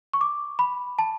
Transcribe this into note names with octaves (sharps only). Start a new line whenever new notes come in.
C#6
D6
B5
A5